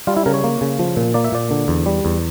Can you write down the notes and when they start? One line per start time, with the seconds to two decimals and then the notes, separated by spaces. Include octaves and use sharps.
0.07 G3 F4
0.17 E4
0.26 C#3 A#4
0.34 C#5
0.44 A#3
0.61 C#3
0.79 F3
0.96 A#2
1.14 A#3 D5
1.24 E5
1.32 A#2 D5
1.51 D3
1.68 E2
1.86 G3
2.05 E2